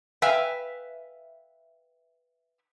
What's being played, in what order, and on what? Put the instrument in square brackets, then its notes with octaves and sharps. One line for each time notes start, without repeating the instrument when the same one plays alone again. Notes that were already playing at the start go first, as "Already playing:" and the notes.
[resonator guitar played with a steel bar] B4 E5 F5 G5 G#5